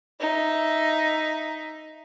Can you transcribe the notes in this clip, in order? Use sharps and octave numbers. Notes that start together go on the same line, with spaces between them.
D#4 E5